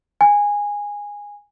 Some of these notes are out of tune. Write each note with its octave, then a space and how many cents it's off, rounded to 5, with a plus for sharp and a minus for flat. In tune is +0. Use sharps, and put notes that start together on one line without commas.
G#5 -15